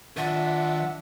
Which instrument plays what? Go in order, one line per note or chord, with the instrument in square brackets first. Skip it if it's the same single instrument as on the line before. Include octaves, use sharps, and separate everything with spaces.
[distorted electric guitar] D#3 B4 [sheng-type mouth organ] D4 E5 [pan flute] F4 [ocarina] F#5